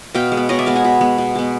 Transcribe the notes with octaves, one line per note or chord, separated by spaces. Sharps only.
B2 F5 G5
G#3
B3
B2 C#5 D#5
D5 E5
G#3 B3 D#5 F5
F#5 G#5
B2
G#3 B3
B2
G#3 B3